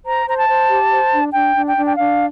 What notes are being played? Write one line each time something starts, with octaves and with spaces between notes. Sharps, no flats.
C5 A#5
C5 A#5
A5
C5
G4
C5
D4
D4 G5
D4
G5
D4
G5
D4 F5